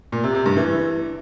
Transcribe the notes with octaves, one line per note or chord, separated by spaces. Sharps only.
A#2
C3
C3
G2
E3